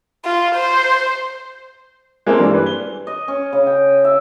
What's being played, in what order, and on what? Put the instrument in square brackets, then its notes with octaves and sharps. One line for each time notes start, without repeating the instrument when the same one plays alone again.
[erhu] F4
C5
[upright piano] G#3 A#3 C4 C#4 A4
G2 E3 D4
B4
G7
[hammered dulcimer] D#5
C#4
C#3
G5
E5